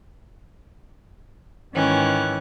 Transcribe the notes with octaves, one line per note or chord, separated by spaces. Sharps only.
G#2 D#3 E3 C#4 F#6